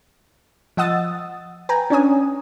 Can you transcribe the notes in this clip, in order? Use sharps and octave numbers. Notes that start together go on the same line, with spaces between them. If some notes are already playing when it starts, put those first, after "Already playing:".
F3 D#5 F#5 D#6 E6 A6
B4 G5 G#5 A#5
C#4 D4 C#5 G#5 D#6